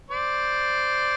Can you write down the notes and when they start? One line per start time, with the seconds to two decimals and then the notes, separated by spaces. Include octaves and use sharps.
0.10 C5 D5